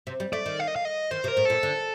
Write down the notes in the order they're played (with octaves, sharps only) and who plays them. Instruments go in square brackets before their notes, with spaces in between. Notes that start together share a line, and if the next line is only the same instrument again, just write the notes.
[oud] C3
G3
[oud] A3 [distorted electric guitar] D5
[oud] D#3
[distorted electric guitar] F5
D#5
F5
D#5
[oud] D#3 [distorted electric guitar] C5
[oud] C3
[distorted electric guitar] A#4
[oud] A2
[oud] A#2 [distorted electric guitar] A4
[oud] D3